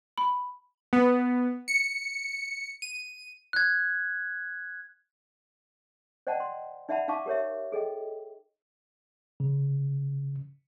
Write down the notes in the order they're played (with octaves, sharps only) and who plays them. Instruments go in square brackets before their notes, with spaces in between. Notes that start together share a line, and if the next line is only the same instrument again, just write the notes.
[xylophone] B5
[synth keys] B3
C#7
D#7
[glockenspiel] F#6 G#6
[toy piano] C5 D5 D#5 F#5 G5 A5
C6
D#4 D5 E5 F#5 A5 B5
D#4 F5 A5 C#6 D6
G4 A#4 C#5 E5
G#4 A4 D#5 G5
[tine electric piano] C#3